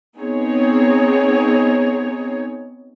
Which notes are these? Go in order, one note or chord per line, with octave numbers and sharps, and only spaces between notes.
B3 C4 D#4 G#4 C#5